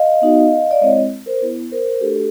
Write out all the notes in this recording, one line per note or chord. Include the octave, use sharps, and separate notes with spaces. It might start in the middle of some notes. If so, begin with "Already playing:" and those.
Already playing: D#5 F5
B3 D#4 F#4
D5
G#3 C4 E4 C#5 D#5
A#4 C5
B3 E4
A#4 C5
A3 D4 F#4 G4 A4